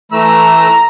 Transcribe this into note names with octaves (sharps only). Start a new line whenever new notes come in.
E3 A3 A#5 E6